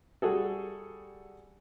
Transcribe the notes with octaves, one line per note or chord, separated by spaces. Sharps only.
G3 F#4 G#4 A4